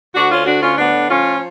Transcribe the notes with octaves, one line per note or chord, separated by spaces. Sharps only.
D2 D4 F#4
C#4 F4
D3 D4 F#4
C#4 F4
A2 B3 D4
F3 C#4 F4